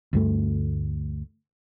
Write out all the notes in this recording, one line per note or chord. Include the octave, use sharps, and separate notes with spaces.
D2 G2 A3